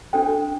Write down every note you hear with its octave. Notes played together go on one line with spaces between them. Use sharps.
D4 A4 C5 G5